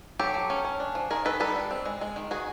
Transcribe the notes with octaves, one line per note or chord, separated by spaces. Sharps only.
F#3 G4 A4
F#3
C#4
C#4
D4
F3
D#3 G#4 A#4
D#3 A4 B4
G3 A4 B4
D4
C4
G#3
G#3
D#3
D#3 F#4 G#4